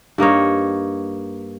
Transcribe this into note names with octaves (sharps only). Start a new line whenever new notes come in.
G2 A#3 D#4 C#5